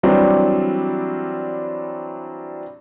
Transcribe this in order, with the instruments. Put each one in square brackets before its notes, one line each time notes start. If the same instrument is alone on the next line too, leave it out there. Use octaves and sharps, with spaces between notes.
[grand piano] E3 F#3 G3 C4 D4 D5